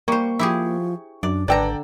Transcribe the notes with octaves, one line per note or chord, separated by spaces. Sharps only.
G3 A#3 C5 C#6
F3 E4 G4 G#4
F#2 D4 D5
G#1 D3 A4 B4 D5 G5 A#5